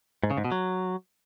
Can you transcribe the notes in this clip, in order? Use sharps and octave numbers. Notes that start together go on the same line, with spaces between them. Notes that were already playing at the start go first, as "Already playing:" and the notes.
G#2
C#3
G#2
B2
F#3